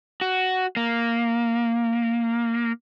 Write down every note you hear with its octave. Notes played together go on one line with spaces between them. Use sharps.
F#4
A#3